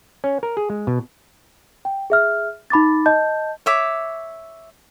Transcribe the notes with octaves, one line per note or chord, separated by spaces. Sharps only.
C#4
A#4
G#4
G#3
B2
G5
G#4 E5 F6
D#4 B5 D6 A6
D#5 A5 G6
C#5 E5 D6